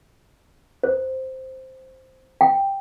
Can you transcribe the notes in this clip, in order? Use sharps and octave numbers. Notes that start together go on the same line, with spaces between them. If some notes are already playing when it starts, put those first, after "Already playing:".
C5
G5